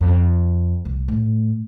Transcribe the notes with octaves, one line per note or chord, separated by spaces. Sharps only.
F2
C2
A2